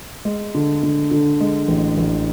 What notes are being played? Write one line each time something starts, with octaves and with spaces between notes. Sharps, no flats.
G#3
D3
D3
D3
G#3
A1
A1